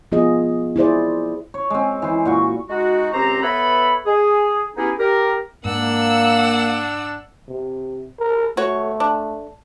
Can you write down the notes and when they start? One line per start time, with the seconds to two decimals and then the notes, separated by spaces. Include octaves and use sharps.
0.12 F3 B3 F4 G#4 D#5
0.76 E4 G#4 C5 D5
1.54 C#5
1.70 G#3 C4
2.02 E3 C5
2.25 A#2 F#4 C#6
2.69 G#3 D#4 F#4
3.13 C#2 C4 G4 C5 A#5
3.43 B3 A4 B4 C#5 E5 B5
4.06 G#4
4.76 B3 C#4 D#4 E4 G4 G#4
4.99 G4 A#4
5.65 G#2 A#3 D4 F#5 E6
7.48 C3
8.19 A#4
8.57 A3 F#4 C#5
9.00 D4